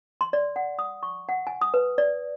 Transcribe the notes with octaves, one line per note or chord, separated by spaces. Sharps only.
C6
D5
F#5
D#6
C#6
F#5
G#5
D#6
B4
D5